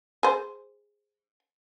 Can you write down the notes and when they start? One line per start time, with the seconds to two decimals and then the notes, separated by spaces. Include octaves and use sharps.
0.23 G#4 C5